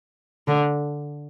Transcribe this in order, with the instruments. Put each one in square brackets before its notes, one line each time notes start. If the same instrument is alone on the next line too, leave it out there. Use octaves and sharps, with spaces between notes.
[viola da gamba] D3